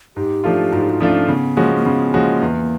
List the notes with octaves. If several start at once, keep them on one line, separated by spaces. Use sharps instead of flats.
G#2 G4
F3 A3 D4 F4
G#2 F#4
G4
F#4
F3 A3 C#4 D4 F4
C#3 B3
F3 G#3 A#3 C#4 F#4
A#3
C#3 B3
F3 G#3 A#3 C#4 F#4
E2